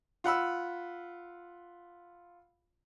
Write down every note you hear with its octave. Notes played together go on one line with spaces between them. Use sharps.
F4 F#5 B5 E6